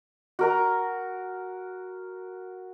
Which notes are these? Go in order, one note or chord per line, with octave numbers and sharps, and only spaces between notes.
F#4 A#4 A#5